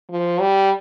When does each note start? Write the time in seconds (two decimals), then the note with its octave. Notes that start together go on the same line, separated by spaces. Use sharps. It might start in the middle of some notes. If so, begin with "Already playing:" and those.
0.11 F3
0.40 G3